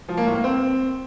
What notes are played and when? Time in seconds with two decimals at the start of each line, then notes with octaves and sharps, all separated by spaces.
0.09 F3
0.17 A#3
0.26 A2
0.35 A#3
0.44 C4